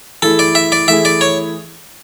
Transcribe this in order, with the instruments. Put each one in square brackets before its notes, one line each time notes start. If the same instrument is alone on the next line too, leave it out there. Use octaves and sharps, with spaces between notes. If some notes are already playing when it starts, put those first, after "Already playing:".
[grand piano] E3 A3 E4 G#4 [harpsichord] A4
[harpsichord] D5
E5
D5
[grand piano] E3 A3 E4 G#4 [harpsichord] E5
[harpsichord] D5
C#5